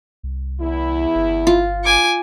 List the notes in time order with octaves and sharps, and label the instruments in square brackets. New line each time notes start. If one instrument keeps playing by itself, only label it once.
[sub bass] C2
[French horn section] E2 E4
[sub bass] G1
[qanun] F4
[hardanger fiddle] G#5 D6